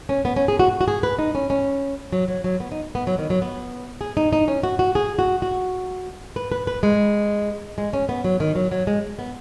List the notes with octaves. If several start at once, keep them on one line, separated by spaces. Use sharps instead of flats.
C#4
B3
C#4
G#4
F#4
F#4
G#4
B4
D#4
C#4
C#4
F#3
F#3
F#3
B3
D#4
B3
F#3
D#3
F#3
B3
G#4
D#4
D#4
C#4
F#4
F#4
G#4
F#4
F#4
B4
B4
B4
G#3
G#3
C#4
B3
F#3
D#3
F#3
F#3
G#3
B3